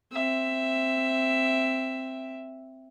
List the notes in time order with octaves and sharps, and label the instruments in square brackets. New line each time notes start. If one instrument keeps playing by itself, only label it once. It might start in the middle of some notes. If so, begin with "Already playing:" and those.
[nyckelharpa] C4 E5